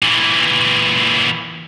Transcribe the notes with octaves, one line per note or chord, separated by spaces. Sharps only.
A#2 E3